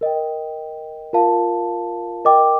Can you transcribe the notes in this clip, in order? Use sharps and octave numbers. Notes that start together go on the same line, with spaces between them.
A#4 D#5 G5
F4 A#4 F5 A5
A#4 D#5 G5 D6